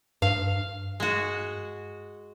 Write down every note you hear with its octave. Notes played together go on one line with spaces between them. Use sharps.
G2 F5
G#3 F#4